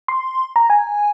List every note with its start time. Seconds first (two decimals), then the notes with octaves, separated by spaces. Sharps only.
0.08 C6
0.56 A#5
0.70 G#5